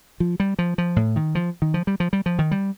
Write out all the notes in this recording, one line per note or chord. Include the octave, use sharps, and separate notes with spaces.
F3
G3
F3
F3
A2
D#3
F3
D#3
F3
G3
F3
G3
F3
D#3
G3